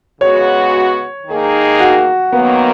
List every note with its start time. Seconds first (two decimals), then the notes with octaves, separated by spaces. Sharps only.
0.21 C#3 G#3 B3 F#4 C#5
1.27 D#3 A#3 D#4 G#4
1.80 F#4
2.33 F#2 D#3 F#3 A#3 B3